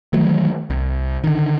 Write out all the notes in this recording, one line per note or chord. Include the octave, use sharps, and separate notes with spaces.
D#3 E3 F#3 A3
C2
D3 D#3